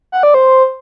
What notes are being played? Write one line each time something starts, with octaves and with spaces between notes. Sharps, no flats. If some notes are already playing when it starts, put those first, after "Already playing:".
F#5
D5
C5